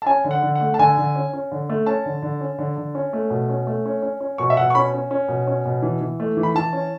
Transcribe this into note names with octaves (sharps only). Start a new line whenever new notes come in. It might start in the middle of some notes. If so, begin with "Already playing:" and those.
A5
C#4 G#5
D3
F#5
D3
F#5
A3
A5
D3 G#5
D3
C#4
C#4
D3
A3
C#4 A5
D3
D3
C#4
D3
D3
C#4
A3
B2
C#4
A3
C#4
C#4
C#4
B2 C#6
E5
B2 F#5
C#6
C#4 B5
C#4
C#4
B2
C#4
B2
E3
E3
A3
E3
B5
E3 A5
C#4